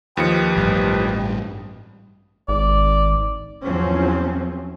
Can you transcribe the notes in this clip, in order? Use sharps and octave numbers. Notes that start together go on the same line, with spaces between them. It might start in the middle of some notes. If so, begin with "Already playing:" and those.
D#2 F3 G4 B4 D#5 C#7
A1 G2
G#1 D5
E2 F3 F#3 C4 C#4